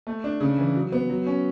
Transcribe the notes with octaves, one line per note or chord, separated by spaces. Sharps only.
A3
D4
C#3
E3
F#3
B3
F#3
C#4